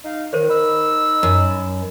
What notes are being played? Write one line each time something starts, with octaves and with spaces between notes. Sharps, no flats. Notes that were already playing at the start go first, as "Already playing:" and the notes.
D#4 F5
D#3 A#4 C5 C#5
D#4 B5 E6
F#2